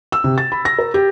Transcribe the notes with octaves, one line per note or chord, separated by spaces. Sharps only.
E6
C3
A6
B5
A#6
A#4
G4